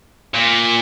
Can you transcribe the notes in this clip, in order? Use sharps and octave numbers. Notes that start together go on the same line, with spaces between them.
A#2